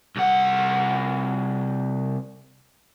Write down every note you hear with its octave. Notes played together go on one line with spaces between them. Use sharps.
C2 F#5